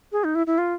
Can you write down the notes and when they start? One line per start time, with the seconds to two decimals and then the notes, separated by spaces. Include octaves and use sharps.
0.12 G#4
0.24 D#4
0.35 E4
0.47 E4
0.58 F4